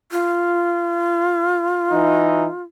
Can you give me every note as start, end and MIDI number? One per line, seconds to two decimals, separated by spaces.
0.12 2.63 65
1.91 2.47 52
1.91 2.47 63